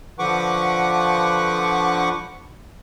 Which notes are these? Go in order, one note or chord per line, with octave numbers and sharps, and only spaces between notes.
D3 F3 B4 F#5 C#6 D6